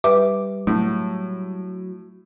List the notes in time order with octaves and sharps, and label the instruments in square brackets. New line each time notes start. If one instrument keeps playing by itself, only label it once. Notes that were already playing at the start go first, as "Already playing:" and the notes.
[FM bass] G3 [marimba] B4 E5 [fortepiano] D6
[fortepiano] A2 [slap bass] F#3